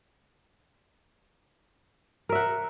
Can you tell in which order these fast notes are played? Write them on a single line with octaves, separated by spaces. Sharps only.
A#4 E5 F#5